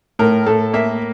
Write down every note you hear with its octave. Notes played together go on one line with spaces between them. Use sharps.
A2 A#4
A2 A4
A#3 E5